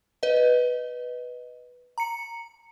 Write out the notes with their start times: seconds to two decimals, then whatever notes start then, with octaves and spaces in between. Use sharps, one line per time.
0.23 B4 D#5
1.98 A#5 C#7